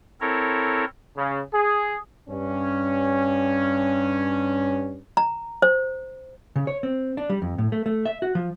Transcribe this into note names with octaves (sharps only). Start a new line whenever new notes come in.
C4 E4 A4 A#4 C#5
C#3
G#4
G2 C#4
A#5
C5
C#3
C#5
C4
D4
G3
F2
A2
A3
A3
E5
F#4
F3